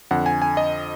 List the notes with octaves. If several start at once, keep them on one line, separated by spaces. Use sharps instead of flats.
F2 D3 F#5
G#5
G#5
D#5